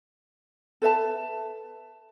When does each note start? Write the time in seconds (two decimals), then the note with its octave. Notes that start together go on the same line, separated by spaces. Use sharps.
0.82 A4 B4 E5 A5